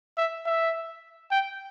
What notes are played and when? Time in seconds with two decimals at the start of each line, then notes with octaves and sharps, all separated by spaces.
0.18 E5
0.46 E5
1.31 G5